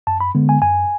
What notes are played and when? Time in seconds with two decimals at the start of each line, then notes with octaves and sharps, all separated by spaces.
0.07 F#2 A5
0.20 B5
0.35 D3 G#3 B3
0.49 G#5
0.62 F#2 G#5